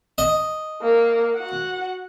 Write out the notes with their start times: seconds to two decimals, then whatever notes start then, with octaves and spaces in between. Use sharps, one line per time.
0.18 D#5
0.82 A#3
1.35 F#4 F#5